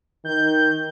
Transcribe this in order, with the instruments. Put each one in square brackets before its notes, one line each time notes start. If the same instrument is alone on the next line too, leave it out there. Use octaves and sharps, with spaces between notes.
[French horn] D#3 [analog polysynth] G6